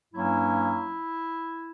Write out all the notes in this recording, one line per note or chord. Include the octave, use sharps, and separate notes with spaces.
G2 F#3 A#3 C#4 E4